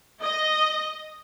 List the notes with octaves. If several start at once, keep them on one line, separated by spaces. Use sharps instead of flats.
D#5